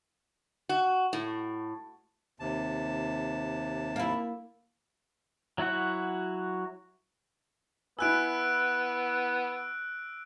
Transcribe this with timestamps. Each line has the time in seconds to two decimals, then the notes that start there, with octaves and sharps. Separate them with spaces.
0.69 F#4
1.13 A2
2.40 D#2 C3 A5
3.96 A#3 E4
5.58 F#3 E4 F#4 F#5
7.99 B3 E4 G#5 E6 F#6 D7